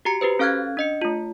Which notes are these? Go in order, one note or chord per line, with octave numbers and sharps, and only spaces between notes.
F#4 G4 A#5 C#7
F#4 G4 B4 C5
C#4 A4 F5 F6 F#6 G#6
D4 D#5 C#7
A3 F4